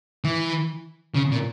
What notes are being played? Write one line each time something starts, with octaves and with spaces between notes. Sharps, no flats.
E3
C#3
A#2